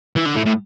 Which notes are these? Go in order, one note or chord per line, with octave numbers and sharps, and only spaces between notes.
E3
D3
A2
A2